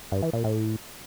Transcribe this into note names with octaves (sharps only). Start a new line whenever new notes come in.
G2
E3
A#2
A2